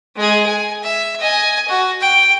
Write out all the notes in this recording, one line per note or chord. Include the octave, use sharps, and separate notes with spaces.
G#3 G#4
G#5
E5
D#5 G#5
F#4
G5